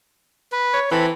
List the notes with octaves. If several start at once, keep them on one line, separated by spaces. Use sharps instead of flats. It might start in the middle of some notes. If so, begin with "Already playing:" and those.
B4
C#5
E3 C4 A4 B5